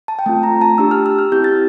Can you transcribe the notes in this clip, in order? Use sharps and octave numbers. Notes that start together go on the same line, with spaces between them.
A5
G5
A3 C4 F4 A5
A#5
A5
D4 G4 E6
F6
E6
F6
C4 E4 G4 G6
A6